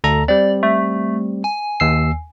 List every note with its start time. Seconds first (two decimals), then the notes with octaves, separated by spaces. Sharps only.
0.04 D2 A4 A#5
0.28 G3 C4 D5
0.63 A3
1.44 G#5
1.80 D#2 E6 C7